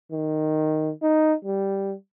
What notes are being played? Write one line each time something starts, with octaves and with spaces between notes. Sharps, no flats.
D#3
D#4
G3